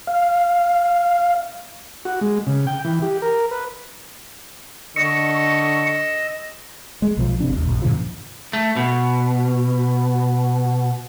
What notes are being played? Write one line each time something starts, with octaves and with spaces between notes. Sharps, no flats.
F5
F#4
G#3
C#3
G5
E3
G4
A#4
B4
D3 D#5 C#6 E6
G#3
B1 F3
G1 C3 D4
A1 D#2
A#1 F#2
F#2 A#2 D3 F3
A3
B2